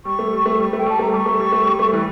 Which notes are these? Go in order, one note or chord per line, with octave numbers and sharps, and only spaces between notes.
G3 C#6
A3
G3
A3
G3
A3
G5
G3 A5
A3 A#5
G3 C#6 D6
A3
G3
A3
G3
A3
E3 G3